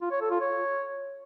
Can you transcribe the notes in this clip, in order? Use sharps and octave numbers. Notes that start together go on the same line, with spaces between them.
F4
C#5
A4
F4
C#5